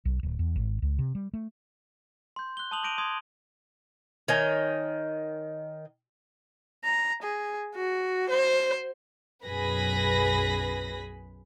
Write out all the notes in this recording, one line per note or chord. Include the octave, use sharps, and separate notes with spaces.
B1
D1
E2
G#1
C#2
C3
G3
A3
C6 G6
F#6 G7
A5 C6 D#6 F7 F#7
D6 G6 A#6 D7 D#7 F7
C6 D#6 G#6
D#3 C#5 D#5 G#5
A#5
G#4
F#4
C5
B1 F#2 G#4 B4 B5 A#6